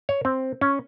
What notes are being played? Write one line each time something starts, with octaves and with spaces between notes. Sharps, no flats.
C#5
C4
C#4